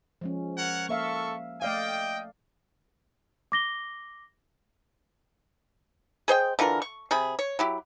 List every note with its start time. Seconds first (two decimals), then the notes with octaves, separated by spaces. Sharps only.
0.21 F3 G#3 C#4
0.58 A#4 C#5 F#5
0.89 A#3 A4 E5 F5 C#6
1.62 A3 D5 D#5 F5 G5
3.52 D6 A#6 G7
6.28 G#4 C5 D#5 G5
6.59 D3 E3 F4 A#4
6.82 C#6
7.11 C3 G#4 B5
7.39 C#5
7.59 F#3 E4 G4